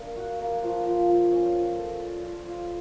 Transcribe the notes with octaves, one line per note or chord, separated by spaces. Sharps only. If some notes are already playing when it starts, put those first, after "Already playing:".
Already playing: A#3 D4 A#4
F#4
A#3
F3
F3
F3
C#4
F3
A4
D5
F4
F4